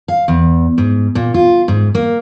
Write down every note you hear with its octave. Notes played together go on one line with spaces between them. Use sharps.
F5
E2
G#2
A#2
F4
G#2
A#3